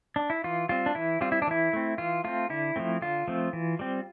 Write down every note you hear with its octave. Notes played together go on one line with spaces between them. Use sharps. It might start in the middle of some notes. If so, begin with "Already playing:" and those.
D4
E4
E3 F4
G3 C4 F4
D4
E3 E4
G3 C4 F4
E4
D4
E3 E4
A3 C4
E3 F4
A3 C4 F4
D3 E4
F3 A3 C4
D3 F4
F3 A3 C4
E3
G3 C4